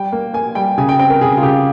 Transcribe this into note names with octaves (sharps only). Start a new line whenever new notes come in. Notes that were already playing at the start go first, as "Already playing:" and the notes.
Already playing: G3 G5
A#3
A#3 G#5
G3 G5
C#3 G#5
G5
C4 G5
A#4
C#3 G#4
F4
C#3 G4